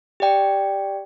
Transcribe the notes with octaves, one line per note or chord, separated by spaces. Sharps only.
G4 D5 G5